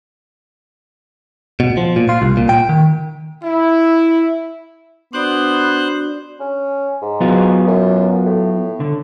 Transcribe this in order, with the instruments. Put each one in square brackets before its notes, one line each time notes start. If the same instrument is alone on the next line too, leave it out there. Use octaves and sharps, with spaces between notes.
[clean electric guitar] B2
F3
A#2
F4
C2
A#2
G5
D#3
[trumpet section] E4
[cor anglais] B3 [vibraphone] D4 F#4 D5 [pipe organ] C5 F#6
[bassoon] C#4
G#2
[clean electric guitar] F#3 B3 F4
[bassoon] F#2
A2
[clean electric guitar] D3